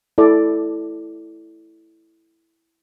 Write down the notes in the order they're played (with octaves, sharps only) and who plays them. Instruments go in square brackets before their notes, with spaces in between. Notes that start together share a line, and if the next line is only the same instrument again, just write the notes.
[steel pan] E4 A4 D5